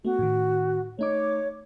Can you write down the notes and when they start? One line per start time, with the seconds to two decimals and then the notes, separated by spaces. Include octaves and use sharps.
0.05 A3 B3 F#4
0.19 A2 D#3
0.99 A3 D#4 C#5 D6